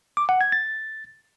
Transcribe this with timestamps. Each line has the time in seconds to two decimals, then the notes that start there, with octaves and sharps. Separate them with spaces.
0.17 D6
0.29 F#5
0.41 G#6
0.52 A6